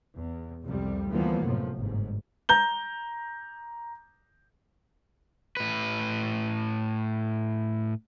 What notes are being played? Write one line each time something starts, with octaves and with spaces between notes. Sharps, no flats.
E2
C2 F2 C3 G3
D2 E3 F3 G3 A#3 B3
F#2 A2 C3 F3
G1 G#2
A#5 G6 G7
A2 B4